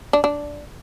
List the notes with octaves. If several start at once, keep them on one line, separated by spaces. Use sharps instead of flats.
D4
D4